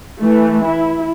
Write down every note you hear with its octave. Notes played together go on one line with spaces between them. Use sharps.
E3 A3
E4